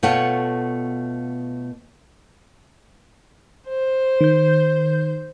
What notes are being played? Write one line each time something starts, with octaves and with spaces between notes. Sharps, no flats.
B2 A3 F4 C#5 F#5 G5
C5
D#3 G6